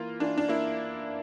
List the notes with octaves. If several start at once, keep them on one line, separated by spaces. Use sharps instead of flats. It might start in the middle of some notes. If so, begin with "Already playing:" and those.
Already playing: E3 A#3 F4
E3 D4
D4
A#3 E4